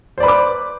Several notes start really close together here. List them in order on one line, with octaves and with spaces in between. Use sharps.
C5 D5 B5 B4 D6